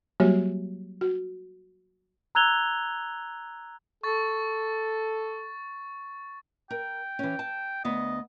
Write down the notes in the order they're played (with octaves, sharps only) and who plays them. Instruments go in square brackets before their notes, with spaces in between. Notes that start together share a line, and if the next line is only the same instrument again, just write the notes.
[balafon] F#3 G3 A#3 F#4 G4 C#5
F#4
[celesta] A#5 E6 F#6 G#6 F7 G7
[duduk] A4 [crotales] C#6 A6
[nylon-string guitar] A#4 [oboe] G5
[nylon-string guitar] E3 C#4
A5
[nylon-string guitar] D2 B3 [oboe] D#5